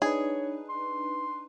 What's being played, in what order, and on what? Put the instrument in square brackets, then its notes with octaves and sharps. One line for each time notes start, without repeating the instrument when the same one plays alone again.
[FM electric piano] D4 D#4 B4 [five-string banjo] G#4 [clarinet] C#5
[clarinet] C6